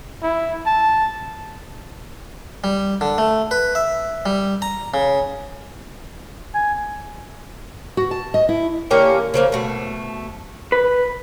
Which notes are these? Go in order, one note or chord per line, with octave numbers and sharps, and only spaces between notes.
E4
A5
G3
D3
A3
B4
E5
G3
A#5
C#3
G#5
F#4
A5
D#5
E4
D3 A#3 C#4 G4
C#3 F3 A#3
B2 A3
B4